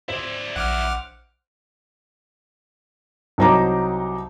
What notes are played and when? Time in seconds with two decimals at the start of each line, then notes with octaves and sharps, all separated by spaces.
0.08 E4 C5 D5
0.56 A#1 F#5 D6 F6
3.38 C2 F#3 D#4 C5 A#5 D6